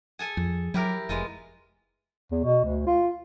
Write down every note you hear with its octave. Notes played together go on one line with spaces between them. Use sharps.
G#4 A4 G#5
F2
F#3 E4 G4 A#4
F1 E3 G#3 F4
E2
B2
D2
F4